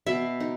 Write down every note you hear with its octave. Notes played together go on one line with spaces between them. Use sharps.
B2 E5
D#4